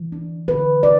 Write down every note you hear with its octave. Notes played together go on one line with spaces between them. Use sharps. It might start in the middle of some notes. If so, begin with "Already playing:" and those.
Already playing: E3
D4
D3 B4
D4 D5